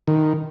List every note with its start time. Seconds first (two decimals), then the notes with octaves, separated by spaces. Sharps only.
0.07 D#3